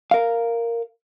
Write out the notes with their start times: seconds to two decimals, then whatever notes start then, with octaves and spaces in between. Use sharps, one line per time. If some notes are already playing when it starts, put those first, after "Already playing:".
0.11 A#4 F5